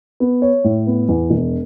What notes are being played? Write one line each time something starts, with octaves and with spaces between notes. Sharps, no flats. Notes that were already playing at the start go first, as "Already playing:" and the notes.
B3
C#5
A2
B3
E2
E1